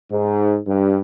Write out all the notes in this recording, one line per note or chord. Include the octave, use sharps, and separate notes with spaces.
G#2
G2